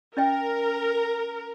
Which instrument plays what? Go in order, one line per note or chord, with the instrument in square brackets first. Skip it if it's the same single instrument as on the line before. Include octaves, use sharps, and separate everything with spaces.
[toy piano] C#4 D#5 G5 [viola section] A#4